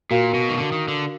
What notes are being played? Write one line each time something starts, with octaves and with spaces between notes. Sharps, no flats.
A#2 F#4 A#4 F5
B2
D#3
D3
D#3
D3